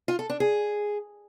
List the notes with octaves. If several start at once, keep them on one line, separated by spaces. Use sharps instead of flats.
F4
A4
D4
G#4